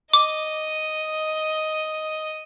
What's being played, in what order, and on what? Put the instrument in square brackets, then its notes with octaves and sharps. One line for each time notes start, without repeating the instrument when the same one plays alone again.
[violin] D#5 [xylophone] D6